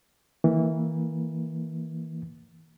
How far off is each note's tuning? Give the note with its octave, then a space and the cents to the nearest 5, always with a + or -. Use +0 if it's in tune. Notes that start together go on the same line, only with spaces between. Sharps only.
E3 -20 A#3 -15